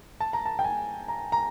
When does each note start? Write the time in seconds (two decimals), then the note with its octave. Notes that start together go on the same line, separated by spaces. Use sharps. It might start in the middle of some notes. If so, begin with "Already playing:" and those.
0.20 A5
0.33 A#5
0.46 A5
0.59 G5
0.64 G#5
1.08 A#5
1.32 A#5